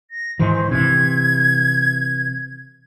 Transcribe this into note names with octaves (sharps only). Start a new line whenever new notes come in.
A#6
G#2 D#3 E3 C5
C3 E3 G#6